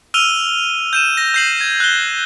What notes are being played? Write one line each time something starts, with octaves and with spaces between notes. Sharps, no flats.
E6 F6 D#7 F7 G7
G6 D#7 E7
A#6
G6 C7 F#7
G#6
F#6 G7